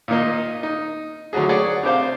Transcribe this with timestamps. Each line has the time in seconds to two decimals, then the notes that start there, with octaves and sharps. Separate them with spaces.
0.08 A#2 D#3 A#3 D#4
0.63 D#4
1.33 D3 F#3 A3 F#4 G#4
1.49 G#4 C#5 D5 F#5
1.83 C3 D4 C5 F5